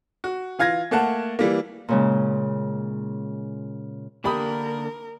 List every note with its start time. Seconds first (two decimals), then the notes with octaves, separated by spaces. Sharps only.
0.24 F#4
0.59 E3 F4 F5 G#6 A#6
0.91 A3 A#3 F#5 A5
1.39 E3 G3 A#3
1.88 A#2 C#3 G#3
4.24 D3 A#3 D4 G4 A#4 B5 D#6